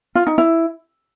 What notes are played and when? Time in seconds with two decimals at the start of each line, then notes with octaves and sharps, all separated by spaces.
0.15 F4
0.27 D#4
0.38 E4